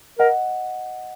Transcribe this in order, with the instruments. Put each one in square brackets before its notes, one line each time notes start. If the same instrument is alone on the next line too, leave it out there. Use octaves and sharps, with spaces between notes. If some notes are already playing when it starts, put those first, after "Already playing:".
[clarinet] A#4 [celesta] D#5 F#5